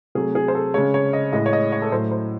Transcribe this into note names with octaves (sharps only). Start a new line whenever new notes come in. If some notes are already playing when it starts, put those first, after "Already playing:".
C3 F#3 A3 G#4
G#4
C5
A4
C#3 G#3 C#5
C#5
D#5
A2 G#3 D#5
C#5
D#5
C#5
A4
A2 F#3 A3 C5
C5